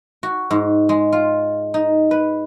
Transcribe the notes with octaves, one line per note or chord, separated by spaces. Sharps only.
F#4
G#2
G#3
F4
D#4
B4